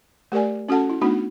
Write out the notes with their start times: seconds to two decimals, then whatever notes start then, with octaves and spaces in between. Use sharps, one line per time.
0.32 A3 G4 A#4 D5 G#5
0.69 C#4 F#4 A4 F#5 A5
0.90 E4
1.01 A3 B3 D4 D#4 F#4